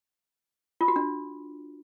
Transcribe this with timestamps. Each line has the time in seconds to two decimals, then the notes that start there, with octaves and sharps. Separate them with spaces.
0.81 F4
0.88 F#4
0.96 D4